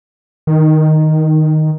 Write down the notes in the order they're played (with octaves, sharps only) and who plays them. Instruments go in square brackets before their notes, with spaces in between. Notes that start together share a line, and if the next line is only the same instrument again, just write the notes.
[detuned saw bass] D#3